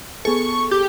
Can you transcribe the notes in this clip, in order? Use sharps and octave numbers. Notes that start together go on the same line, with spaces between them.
B3 G#4 A4 C#6
G4